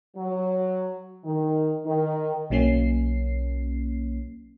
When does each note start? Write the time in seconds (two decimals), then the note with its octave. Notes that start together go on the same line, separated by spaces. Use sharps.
0.16 F#3
1.24 D#3
1.85 D#3
2.50 B1 F#3 A#3 C#4 C7